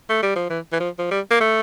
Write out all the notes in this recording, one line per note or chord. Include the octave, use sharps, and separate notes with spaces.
A3
G3
F3
E3
E3
F3
F3
G3
A#3
A3